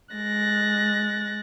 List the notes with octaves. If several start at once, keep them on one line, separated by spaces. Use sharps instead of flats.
G#3 F#6 A6 A#6